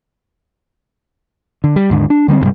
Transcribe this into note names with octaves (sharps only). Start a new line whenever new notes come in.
D3
G3
D#2 G#2 D3
D4
D3 G3 B3 C4
D2 G2 C3 G3